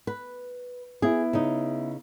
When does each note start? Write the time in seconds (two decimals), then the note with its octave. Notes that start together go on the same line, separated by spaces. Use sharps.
0.07 B4
1.02 B3 E4 G#4
1.33 C#3 D#4